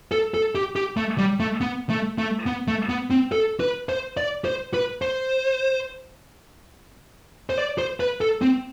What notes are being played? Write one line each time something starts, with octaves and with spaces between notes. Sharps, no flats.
A4
A4
G4
G4
A3
G3
A3
B3
A3
A3
B3
A3
B3
C4
A4
B4
C5
D5
C5
B4
C5
C5
D5
C5
B4
A4
C4